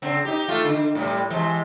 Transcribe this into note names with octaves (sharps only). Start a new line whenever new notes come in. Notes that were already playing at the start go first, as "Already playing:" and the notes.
C#3 C4
D#4 G4
A3 F4
D3
A2 C3 G3
C3 E3 G#3